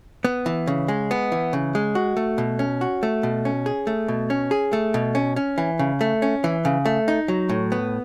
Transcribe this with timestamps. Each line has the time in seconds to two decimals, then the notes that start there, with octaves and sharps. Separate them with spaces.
0.25 B3
0.46 E3
0.67 C#3
0.88 G#3
1.11 B3
1.32 E3
1.53 C#3
1.75 G#3
1.95 F#4
2.17 A3
2.38 B2
2.59 C#4
2.81 F#4
3.03 A3
3.23 B2
3.45 C#4
3.66 G#4
3.87 A3
4.08 B2
4.30 C#4
4.51 G#4
4.73 A3
4.94 B2
5.15 C#4
5.36 C#4
5.58 E3
5.79 C#3
6.01 A3
6.22 C#4
6.44 E3
6.65 C#3
6.86 A3
7.08 D#4
7.28 F#3
7.49 A2
7.72 B3